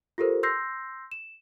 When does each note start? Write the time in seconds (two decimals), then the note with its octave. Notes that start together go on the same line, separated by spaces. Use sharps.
0.18 F4 G4 A4 A#4 C5
0.43 C6 E6 G6 A#6 C7
1.12 E7